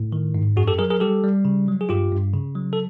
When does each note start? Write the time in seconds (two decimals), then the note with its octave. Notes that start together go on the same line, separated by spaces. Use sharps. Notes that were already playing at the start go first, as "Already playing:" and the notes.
Already playing: A2
0.12 D#3
0.35 G#2
0.56 F#2 F#4 G#4
0.68 G4 A4
0.78 F#3 G#4 A#4
0.90 G#4 A#4
1.00 G3 G4 A4
1.24 G3
1.45 C#3
1.68 F#3
1.81 G#4
1.89 G2 F4 G4
2.12 G2
2.33 C#3
2.55 F#3
2.73 A4